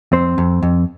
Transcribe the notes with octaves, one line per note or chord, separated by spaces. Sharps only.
F2 C4 C5
F2
F2